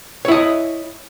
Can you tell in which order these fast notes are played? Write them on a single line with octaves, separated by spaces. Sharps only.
C#5 E4 D#5